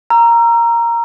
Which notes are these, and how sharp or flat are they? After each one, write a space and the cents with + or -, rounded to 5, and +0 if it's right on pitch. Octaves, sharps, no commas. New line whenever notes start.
A#5 +0 E6 +35